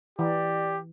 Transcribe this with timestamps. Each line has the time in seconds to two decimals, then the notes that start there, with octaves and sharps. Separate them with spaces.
0.19 E3 G4 D5